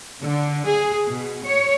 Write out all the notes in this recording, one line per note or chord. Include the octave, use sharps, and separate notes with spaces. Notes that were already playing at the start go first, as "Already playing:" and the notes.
D3
G#4
B2
C#5